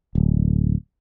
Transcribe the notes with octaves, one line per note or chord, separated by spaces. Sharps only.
D1